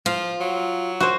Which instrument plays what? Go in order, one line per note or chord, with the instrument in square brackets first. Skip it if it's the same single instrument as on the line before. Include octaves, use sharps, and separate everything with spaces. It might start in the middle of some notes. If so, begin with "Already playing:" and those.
[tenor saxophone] F3 [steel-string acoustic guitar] F4
[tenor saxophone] F#3
[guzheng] F#4 C5